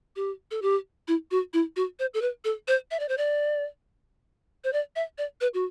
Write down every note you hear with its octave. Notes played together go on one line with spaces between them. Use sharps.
G4
A4
G4
E4
F#4
E4
F#4
C5
A4
B4
A4
C5
E5
D5
C5
D5
C5
D5
E5
D5
B4
F#4